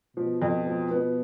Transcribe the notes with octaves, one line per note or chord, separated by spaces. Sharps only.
B2 F3
F2
F3
B3